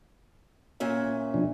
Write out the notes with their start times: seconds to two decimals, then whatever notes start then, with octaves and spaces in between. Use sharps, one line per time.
0.80 A#2 C#4 E5
1.34 B2 F3 D4